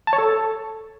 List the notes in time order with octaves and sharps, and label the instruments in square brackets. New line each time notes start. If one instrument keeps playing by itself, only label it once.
[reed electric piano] A5
C#5
A4